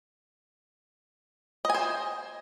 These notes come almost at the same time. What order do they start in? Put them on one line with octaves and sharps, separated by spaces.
D#5 G#5 C5